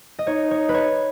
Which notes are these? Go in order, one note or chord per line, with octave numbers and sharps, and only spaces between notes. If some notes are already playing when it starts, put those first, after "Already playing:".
D#5
D#4 C#5
C#5
B4
C#5